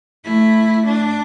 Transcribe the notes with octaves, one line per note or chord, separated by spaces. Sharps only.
A3 E4
D4